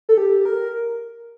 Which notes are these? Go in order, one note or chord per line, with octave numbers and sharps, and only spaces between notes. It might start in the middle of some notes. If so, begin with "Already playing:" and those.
A4
G4
A#4